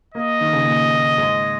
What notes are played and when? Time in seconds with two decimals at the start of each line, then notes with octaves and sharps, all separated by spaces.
0.14 A#3 D#5
0.41 D#3
0.53 C#3
0.66 A#2
1.18 G#2